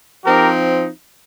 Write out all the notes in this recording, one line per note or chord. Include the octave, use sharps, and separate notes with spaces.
F3 C4 D#4 G4 A#4